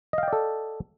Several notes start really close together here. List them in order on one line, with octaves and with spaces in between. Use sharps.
D#5 F5 G5 D5 A4